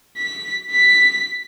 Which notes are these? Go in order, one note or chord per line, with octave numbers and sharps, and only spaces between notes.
B6
B6